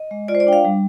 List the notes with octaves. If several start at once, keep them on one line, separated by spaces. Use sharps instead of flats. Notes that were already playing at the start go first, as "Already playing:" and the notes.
Already playing: D#5
G#3
F4 D5
C5
D5
D4 G5
F5
G3